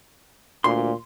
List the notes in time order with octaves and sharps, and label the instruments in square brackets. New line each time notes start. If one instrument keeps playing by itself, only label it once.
[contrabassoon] D2 [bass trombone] A#2 [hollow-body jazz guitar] C6